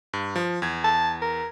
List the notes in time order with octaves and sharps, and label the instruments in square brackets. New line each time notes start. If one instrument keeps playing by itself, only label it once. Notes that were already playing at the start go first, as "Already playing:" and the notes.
[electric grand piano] G2
F3
E2 G#6
[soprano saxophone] A5
A#4